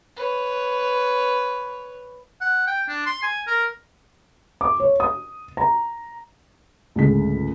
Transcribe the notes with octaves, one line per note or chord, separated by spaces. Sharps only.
B4 C#5
F#5
G5
D4
C6
G#5
A#4
D6
C#5
D#6
A#5
C#2 G#2 D3 A3 G#4 B6